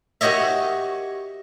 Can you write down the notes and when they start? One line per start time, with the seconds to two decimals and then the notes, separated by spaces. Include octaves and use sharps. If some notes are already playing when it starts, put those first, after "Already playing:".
0.21 F#4 G4 C#5 D#5 E5